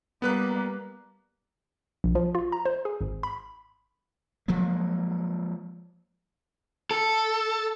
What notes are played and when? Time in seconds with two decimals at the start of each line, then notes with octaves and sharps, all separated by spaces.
0.22 G3 A#3 B3 B4 F#6
2.04 A#1
2.15 F3
2.35 F4
2.52 A#5
2.65 C5
2.85 G#4
3.01 G#1
3.23 B5
4.48 F3 F#3 G#3 A#3
6.91 A4